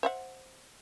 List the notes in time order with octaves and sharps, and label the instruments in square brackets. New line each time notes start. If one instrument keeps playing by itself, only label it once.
[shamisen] C5 E5 F#5